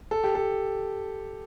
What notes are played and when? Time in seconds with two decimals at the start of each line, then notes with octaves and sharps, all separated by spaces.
0.11 A4
0.24 G4
0.35 A4